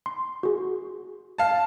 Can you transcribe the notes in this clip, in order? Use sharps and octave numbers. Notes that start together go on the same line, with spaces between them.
C6
F#4 G#4
F5 A5